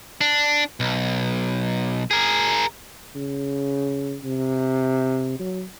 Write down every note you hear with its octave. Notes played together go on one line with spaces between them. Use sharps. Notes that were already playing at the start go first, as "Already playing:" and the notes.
D4
B1
G#4 A#4
C#3
C3
F#3